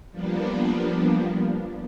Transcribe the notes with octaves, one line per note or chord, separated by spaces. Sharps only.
F3 G3 A#3 B3 D4